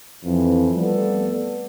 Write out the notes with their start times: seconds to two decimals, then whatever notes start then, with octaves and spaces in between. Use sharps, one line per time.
0.24 F2 E3
0.75 G3 A3 B3 A4 D5